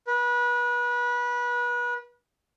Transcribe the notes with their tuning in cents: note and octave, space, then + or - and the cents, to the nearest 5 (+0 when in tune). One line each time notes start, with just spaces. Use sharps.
B4 -30